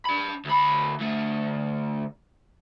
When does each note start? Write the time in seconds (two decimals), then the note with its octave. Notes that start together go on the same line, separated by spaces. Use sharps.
0.05 D4 B5
0.45 D2 B5
1.00 D2 A3